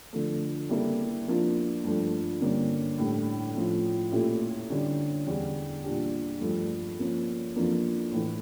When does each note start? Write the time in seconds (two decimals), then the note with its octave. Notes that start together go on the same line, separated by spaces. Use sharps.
0.13 D3 F3 A3
0.69 C#3 G3 A#3 E4 A4
1.26 F3 A#3 D4 F4
1.84 G2 F3 A3 D4
2.41 G2 D3 G3 A#3 C#4
2.98 A2 G3 D4
3.55 A2 F3 C#4 F4
4.12 A#2 A3 C#4 E4 G4
4.70 D3 G3 C#4
5.27 E2 D3 G3
5.83 A#2 G3 D4 G4
6.41 G2 F3 A3
6.98 F3 A#3 C#4
7.56 F2 E3 A#3 D4 F4
8.12 A2 E3 A3